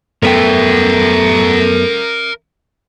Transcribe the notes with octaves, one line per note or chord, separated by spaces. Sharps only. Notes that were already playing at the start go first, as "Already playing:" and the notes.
F#2 A3 B3 A#4 E5 G5